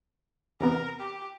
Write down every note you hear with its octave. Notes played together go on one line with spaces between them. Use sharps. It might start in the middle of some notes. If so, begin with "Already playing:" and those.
E2 C3 B3 A#4
G4